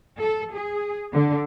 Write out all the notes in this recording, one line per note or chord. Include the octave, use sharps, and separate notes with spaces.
A4
G#4
D3